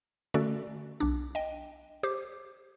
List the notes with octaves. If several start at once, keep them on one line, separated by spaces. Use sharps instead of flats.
D3 A3 C#4 F#4 A4 D5
B1 D4
D#5 G5
G4 C5 D6